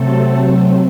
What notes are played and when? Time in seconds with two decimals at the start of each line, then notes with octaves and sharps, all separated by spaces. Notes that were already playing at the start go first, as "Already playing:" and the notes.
Already playing: C3 F#3 A3 C4 A4